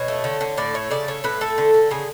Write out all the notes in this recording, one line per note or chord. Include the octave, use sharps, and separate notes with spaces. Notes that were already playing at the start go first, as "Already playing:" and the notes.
Already playing: B2 C#5
A3
D3
D3
A2 D5
A3 C#5
C#3 D5
A3 C#5
A2 B4
A3 A4
D3
D3
C#3 G#4